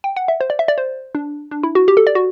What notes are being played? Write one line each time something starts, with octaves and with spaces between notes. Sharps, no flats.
G5
F#5
E5
C5
D5
E5
D5
C5
D4
D4
E4
F#4
G4
A4
D5
F#4